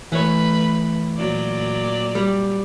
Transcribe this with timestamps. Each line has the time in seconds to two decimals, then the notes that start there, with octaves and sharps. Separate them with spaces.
0.12 E3 A3 B4 C#5
1.16 A#2 F#3 D5
2.15 G3